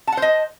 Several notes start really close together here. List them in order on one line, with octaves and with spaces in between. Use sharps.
A5 F#5 C5 D#5